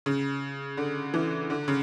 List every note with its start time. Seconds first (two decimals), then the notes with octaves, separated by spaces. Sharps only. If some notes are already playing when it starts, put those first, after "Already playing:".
0.06 C#3
0.77 D3
1.14 E3
1.50 D3
1.68 C#3